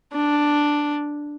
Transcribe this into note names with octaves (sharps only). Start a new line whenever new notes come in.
D4